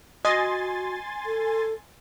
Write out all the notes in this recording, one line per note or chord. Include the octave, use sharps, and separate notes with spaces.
F#4 D#5 G#5 C6 A6
A4